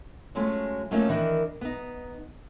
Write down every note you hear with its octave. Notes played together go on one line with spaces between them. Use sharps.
F#3 G#3 A3 C#4 F4 F#4
F#3 A3 A#3 C#4 D#4 F4
D#3 E3 D4 A#4
B3 D#4